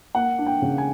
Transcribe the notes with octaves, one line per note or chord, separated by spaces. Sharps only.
A#3 F#5
D4
G5
C#3
G#5